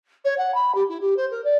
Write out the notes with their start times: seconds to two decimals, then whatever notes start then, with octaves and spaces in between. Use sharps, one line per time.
0.24 C#5
0.37 F#5
0.54 B5
0.74 G4
0.88 E4
1.00 G4
1.16 C5
1.30 A#4
1.44 D5